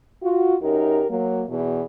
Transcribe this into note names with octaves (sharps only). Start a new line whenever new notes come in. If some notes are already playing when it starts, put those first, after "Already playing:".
F4 F#4
F#2 D#4 G4 A#4
F#3 A#3
E2 B2